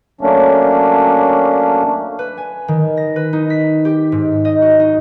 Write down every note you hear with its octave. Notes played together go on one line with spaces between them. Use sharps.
F#3 A3 A#3 C#4 D4
B4
G#5
D#3
A#6
B4
D#4
B6
G4
G#2
D#5
F#4
D#4